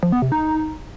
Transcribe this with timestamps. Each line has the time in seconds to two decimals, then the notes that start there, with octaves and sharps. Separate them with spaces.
0.03 F3
0.12 B3
0.22 C3
0.32 D#4